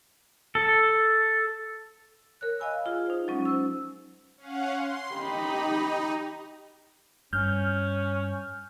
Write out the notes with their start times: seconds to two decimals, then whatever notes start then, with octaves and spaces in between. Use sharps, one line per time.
0.55 A4
2.41 A#4 C#5 F#6
2.59 D#5 F5 G#5 B5 E6
2.86 F4 G#4
3.06 D#4 C5
3.28 F#3 G#3 C#4
3.45 C5 E6
4.37 C#4 F5 F#5
4.71 C6
5.13 D#4 G4 B5
7.33 G2 C#4 F6 G6